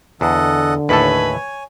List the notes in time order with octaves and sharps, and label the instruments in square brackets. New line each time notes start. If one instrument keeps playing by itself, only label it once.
[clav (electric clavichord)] E2 [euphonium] D3 [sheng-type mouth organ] A4 D#5 F#5
[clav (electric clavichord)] D#2 A2 A4 [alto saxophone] B4 [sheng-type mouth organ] C#5 G#5